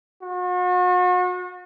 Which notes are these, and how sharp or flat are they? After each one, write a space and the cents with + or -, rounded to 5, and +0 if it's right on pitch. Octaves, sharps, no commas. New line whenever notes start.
F#4 -40